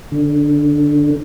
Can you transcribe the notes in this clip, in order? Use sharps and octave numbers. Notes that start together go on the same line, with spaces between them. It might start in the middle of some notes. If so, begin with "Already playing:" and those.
D3